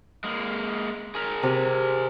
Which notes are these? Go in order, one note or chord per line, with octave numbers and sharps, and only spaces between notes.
G#3 A#3
G#4 A#4
C3